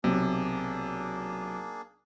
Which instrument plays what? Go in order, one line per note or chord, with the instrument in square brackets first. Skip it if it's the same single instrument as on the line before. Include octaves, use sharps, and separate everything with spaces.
[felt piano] B1 [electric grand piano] C3 [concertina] A#3 D4 G#4